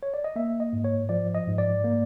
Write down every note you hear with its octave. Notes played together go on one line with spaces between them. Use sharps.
C#5
D5
D#5
A#3 E5
D#5
G#2
C#5
F3 D5
D#5
G#2
D5
A#3